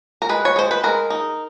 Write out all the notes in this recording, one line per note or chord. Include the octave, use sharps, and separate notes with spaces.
A#4
G#3 B4
C#5
G#3 C5
B4
G#3 A#4
D#4